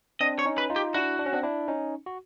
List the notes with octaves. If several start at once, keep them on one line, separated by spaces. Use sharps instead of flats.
C4 D4 D#5
C#5
C#4 D#4
B4
D#4 F4
G4
D4 E4 F#4
D4
C#4
C4 D4
D4 E4
C#4 D#4
F#4